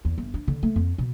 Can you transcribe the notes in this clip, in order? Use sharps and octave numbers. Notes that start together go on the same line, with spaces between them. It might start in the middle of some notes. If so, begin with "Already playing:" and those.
E2
G1
D4
D3
A3
F2
B2